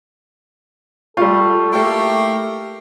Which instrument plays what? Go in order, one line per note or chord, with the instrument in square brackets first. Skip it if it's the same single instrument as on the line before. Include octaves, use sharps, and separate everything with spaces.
[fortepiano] G3 F4 [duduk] A4 [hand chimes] C#6 G6
[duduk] A3 [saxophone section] A#3 E4 G4 [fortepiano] A4 G5